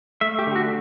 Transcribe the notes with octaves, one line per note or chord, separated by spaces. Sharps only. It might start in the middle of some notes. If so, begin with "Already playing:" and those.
A3 E5
G4
D3
F#4